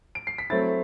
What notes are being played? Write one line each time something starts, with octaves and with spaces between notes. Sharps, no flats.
D7
C7
B6
F#3 A3 C4 E4 A6